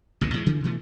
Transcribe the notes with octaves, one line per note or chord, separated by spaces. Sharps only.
A1 D2 B2 D3
A2 E3 G#3
C#3 E3 F3
B2 E3 A3